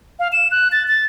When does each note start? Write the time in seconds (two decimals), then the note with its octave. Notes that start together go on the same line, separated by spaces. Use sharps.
0.19 F5
0.32 E7
0.51 F#6
0.72 A6
0.88 A6